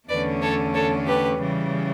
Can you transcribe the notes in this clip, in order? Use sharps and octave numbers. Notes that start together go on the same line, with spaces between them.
E2 D3 A3 C#4 B4 D5
A4 C#5
A4 C#5
G4 B4
C#3 E3 G3